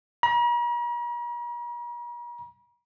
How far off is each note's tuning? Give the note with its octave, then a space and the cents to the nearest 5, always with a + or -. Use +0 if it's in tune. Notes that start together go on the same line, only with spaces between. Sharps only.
A#5 +45